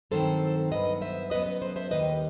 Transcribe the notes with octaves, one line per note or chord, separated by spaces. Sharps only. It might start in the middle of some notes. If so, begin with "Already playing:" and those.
G2 D#3 F#3 C4 A4 C5
G2 F#3 B3 B4 D#5
C5 E5
F#2 F#3 B3 B4 D#5
B4 D#5
A4 C5
C5 E5
D#2 D#3 G3 B4 D#5